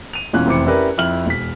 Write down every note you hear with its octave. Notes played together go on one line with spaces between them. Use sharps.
D#7 F7
E1 E2 C#4 F4 F#6
F1 E3 C4 D6 C#7
C#4 E4 G4 A#4 B4 D5
F2 E4 F6 F#7
E1 B6